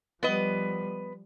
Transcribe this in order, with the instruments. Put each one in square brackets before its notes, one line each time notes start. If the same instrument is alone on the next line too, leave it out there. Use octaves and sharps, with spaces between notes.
[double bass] F3 G3 [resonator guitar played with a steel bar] B3 B4 D#5